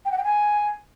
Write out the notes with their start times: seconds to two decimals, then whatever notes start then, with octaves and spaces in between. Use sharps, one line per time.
0.05 G5
0.11 F#5
0.18 G5
0.24 G#5